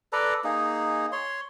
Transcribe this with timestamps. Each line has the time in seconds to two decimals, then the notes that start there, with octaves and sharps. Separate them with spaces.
0.13 A4 B4 D5 A#5
0.44 A#3 D#4 G#4
1.12 C#5 C6